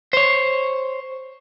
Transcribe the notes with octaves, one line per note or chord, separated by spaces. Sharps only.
C5 C#5